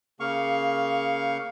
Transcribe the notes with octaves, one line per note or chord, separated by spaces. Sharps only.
C#3 A#3 F5 C#6